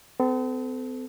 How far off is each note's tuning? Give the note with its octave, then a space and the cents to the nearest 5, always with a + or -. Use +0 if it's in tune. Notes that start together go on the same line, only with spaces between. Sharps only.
C4 -45 A4 -10